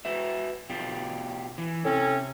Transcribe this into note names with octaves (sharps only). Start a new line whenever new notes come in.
F#4 B4 E5
B2 F4 G4
E3
A2 C3 C4 C#4